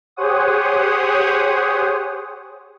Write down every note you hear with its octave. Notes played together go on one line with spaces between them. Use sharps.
G4 G#4 C5 C#5 F#5 D#6